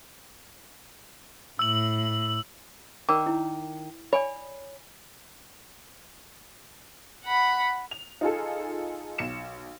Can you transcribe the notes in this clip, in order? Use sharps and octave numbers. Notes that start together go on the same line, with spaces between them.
A2 E6 F#7
D#3 A#4 D5 D6
E4
C#5 D5 G#5 B5
F#5 B5
F7
D#4 F4 G#4 A4
B1 C#7 E7